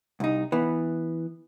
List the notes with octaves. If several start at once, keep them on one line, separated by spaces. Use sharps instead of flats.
C2 D#4
E3 B3